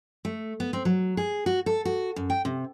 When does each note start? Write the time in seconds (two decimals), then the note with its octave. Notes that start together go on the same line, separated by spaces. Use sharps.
0.25 A3
0.60 B3
0.73 C4
0.85 F#3
1.17 G#4
1.46 F#4
1.66 A4
1.85 F#4
2.16 F#2
2.30 G5
2.45 C3